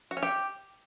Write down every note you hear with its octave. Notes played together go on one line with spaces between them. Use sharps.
F#4
C#4
G4